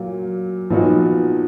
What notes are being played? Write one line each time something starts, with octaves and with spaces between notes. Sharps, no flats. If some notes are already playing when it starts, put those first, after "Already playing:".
Already playing: A#2 F#3 A#3 F4
A#2 F3 B3 D#4 F#4